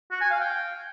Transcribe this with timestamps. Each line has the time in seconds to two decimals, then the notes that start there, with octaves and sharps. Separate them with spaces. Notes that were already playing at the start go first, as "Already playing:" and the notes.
0.11 F#4
0.21 G#5
0.30 F5
0.40 G5